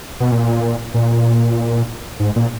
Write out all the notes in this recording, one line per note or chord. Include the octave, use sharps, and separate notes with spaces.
B2
A#2
A#2
G#2
A#2